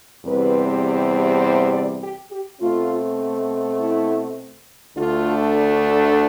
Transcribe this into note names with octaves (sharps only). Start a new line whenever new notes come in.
E2 C3 G3 C4 B4
C5
D5
G4
G4
B2 A3 C4 F4
E4
D2 D3 A3 D4 F4